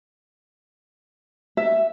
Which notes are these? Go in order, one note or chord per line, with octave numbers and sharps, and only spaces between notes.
E5